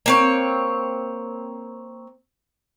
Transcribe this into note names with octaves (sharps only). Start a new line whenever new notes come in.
A#3 C4 C#5